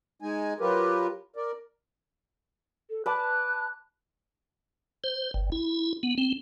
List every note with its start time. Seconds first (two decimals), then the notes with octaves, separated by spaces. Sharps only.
0.22 G#3 D#4 G#5
0.60 F#3 F4 G4 A#4 B4
1.36 A#4 D5
2.90 A4
3.06 B4 D5 A5 F#6
5.04 C5
5.34 G1
5.52 E4
6.03 B3
6.18 C4